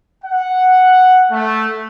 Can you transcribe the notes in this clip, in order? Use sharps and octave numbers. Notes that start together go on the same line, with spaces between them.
F#5
A3